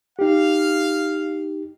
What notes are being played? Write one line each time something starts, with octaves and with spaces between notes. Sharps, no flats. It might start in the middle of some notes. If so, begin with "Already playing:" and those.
D#4 G4 F5